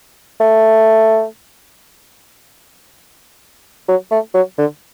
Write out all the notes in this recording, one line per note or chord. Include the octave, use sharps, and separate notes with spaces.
A3
F#3
A3
F#3
D3